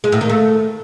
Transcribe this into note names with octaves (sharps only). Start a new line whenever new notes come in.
G#3
A2
D#3
A3